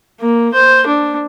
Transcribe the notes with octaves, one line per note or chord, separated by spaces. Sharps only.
A#3
C5
D4